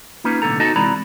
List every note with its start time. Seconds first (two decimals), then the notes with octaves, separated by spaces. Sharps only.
0.24 A#3 C#4 D#4 F4 B4
0.42 B1 A2 D3 B3 A4 A#5
0.60 B3 D#4 F#4 A4 D#5 A5
0.76 C3 E3 G#3 D5 A#5 B5